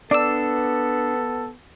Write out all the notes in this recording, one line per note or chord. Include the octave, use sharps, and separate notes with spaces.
B3 D4 A4 D5 D6 E6